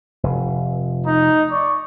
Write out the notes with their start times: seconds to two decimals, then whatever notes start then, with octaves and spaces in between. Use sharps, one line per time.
0.23 F1
1.06 D#4
1.51 D5 C#6